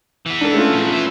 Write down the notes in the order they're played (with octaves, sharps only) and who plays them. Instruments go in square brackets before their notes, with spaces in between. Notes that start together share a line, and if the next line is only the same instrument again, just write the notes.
[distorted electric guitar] E3 B3
[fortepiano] D4 A4
A3 C#4 F4
[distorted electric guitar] A#2 F3
B4 E5